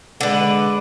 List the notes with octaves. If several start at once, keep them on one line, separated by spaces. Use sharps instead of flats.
D3 G#3 B4